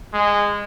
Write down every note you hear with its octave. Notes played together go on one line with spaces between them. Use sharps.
G#3